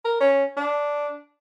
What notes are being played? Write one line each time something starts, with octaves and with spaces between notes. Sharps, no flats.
A#4
C#4
D4